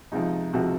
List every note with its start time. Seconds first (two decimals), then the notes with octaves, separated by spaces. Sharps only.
0.12 C#2 C3 F3 D#4
0.53 C#2 C3 F3 F#4